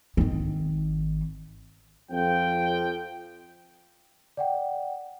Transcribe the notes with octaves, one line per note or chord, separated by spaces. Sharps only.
G#1 D#3
F2 F3 G5
D5 F#5 G5